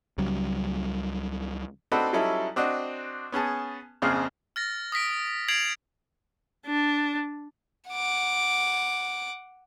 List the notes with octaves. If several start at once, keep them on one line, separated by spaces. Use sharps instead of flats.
C#2 C#3 F#3 G3
C4 D4 D#4 F#4 A4 B4
F#3 G3 C#4 D#4 E4 A4
C4 D4 F#4 D#5
B3 C#4 G#4 A5
A#1 F2 C#3 C4 G#4 F5
F6 A6 A#6
D#6 A#6 B6 D7
G#6 A6 C7 D7 F7 F#7
D4
F#5 D6